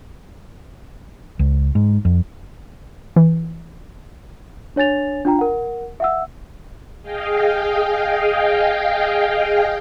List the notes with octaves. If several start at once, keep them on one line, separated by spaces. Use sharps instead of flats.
C#2
G#2
F2
E3
D4 C#5 G#5 A6 F7
D4 F4 G5 A#5
A#4 F#5
E5 F#5 E6
G#4 D#5 F5 G5